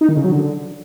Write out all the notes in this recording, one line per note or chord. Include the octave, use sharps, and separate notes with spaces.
D#4
D#3
C#3
F#3
D3